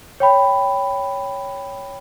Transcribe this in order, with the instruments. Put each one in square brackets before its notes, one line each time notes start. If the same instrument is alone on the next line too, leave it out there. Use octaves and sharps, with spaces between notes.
[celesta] C#5 G5 B5